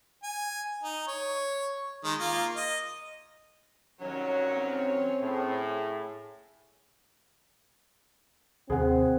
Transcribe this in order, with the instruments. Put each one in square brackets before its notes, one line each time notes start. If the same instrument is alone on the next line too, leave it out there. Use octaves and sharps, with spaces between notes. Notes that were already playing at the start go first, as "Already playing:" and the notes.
[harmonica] G#5
D#4
C#5
D#3 G#3
A#3 F4
D#5
[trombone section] C2 D#3 F#3 [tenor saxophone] C#4 [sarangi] C#5
[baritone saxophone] C4
[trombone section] A2 [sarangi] G#4
[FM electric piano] D#2 C3 [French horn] C4 [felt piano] G#4 F#5